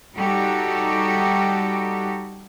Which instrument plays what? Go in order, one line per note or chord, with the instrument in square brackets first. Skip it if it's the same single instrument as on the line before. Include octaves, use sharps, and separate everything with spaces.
[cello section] G3 D#4 F#4 G4 A4